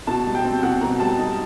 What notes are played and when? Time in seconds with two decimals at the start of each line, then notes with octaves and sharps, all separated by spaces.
0.07 B2 A5
0.26 G3
0.35 G5
0.45 C4
0.63 B2 F#5
0.81 B2 A#5
1.00 G3 A5
1.18 D#4